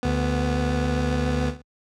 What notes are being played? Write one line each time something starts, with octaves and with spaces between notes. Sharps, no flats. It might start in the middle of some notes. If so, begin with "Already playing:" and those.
D2 B3